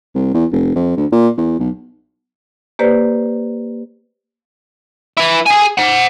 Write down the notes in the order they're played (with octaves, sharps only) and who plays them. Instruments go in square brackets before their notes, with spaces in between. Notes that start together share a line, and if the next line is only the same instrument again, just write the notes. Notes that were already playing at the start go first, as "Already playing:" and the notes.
[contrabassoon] C2
E2
F1
F2
D2
A#2
E2
B1
[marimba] A#3 G4 B4 C5 D5
[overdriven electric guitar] E4 B4
G#4 G#5
C5 F#5